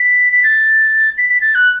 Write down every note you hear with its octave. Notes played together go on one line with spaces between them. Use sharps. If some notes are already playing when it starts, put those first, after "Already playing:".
Already playing: B6
B6
A6
B6
B6
A6
F#6